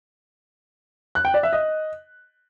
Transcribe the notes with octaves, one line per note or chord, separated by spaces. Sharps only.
F#6
G5
D5
E5
D#5